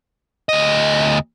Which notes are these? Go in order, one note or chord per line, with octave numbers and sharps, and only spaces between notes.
D2 D#5